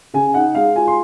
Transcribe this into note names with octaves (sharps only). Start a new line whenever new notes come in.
C#3 G#5
D#4 F#5
G#3 F5
F4 G#5
C6